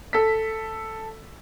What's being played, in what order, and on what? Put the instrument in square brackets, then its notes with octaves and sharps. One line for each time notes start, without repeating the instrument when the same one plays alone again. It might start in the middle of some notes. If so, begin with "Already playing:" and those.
[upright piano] A4 B6